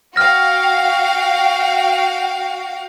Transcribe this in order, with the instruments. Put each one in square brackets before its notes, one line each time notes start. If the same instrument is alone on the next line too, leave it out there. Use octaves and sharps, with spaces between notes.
[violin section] F#4 F5 G5 [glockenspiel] F6 A#6